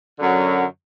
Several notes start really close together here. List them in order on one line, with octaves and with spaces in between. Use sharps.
D3 F#2 F#3